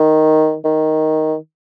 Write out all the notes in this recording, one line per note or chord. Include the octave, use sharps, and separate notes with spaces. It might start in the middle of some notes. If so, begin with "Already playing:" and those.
Already playing: D#3
D#3